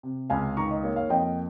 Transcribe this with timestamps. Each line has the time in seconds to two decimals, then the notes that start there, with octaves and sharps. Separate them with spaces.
0.03 C3
0.30 C#2 F5 G#5
0.57 D#3 A#5 C#6
0.71 D#5
0.83 A#3 C#5
0.96 C#5 F5
1.10 F2 D#5 G5